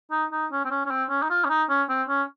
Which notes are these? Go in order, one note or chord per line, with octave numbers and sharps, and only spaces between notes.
D#4
D#4
C#4
C4
C#4
C#4
C4
C#4
D#4
F4
C#4
D#4
C#4
C4
C#4